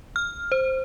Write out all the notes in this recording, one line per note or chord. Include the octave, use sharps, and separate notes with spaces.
F6
C5